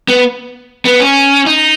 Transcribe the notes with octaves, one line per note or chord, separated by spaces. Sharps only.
B3
B3
C#4
D#4